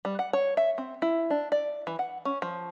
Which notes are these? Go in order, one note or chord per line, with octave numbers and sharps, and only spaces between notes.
G3
F#5
C#5
E5
C4
E4
D4
D5
E3
F#5
C#4
F3